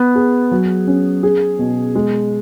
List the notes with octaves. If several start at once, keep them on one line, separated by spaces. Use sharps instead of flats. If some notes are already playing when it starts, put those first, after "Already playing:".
Already playing: B3
G#4
F#3
C#4
G#4
B2
G#3